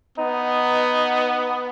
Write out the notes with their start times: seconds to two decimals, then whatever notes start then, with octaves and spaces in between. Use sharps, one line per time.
0.18 B3 D#4